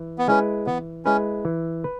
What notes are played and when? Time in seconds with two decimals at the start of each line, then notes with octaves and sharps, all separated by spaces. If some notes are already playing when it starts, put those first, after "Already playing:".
Already playing: E3
0.18 B3
0.28 G#3 C#4 E4 B4
0.66 E3 B3
1.05 G#3 C#4 E4 B4
1.45 E3
1.84 B4